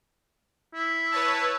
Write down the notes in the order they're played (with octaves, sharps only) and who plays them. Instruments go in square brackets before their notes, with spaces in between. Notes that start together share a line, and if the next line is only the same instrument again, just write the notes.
[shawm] E4
[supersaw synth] B4 C#5 A5